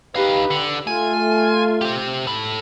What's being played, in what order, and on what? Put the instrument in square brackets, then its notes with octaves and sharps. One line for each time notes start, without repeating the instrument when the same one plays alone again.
[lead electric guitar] D#4 F5 [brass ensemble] G4 B4
[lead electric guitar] D3
[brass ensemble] A3 F4 [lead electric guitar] G#5
[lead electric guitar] G4 C5
A4 B5